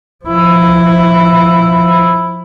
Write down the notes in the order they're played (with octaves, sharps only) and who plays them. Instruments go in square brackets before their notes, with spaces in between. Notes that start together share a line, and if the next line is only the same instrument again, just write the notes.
[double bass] F3 E4